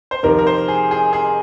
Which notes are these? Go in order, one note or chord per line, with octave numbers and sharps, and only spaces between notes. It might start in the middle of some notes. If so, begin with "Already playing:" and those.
C5
F2 C3 D#3 A#4
A#4
C5
G#4
G#4
G#4